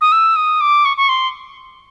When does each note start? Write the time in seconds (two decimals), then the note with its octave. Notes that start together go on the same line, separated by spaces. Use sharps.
0.01 D#6
0.12 E6
0.36 D#6
0.61 D6
0.85 C#6
0.97 C#6
1.09 C6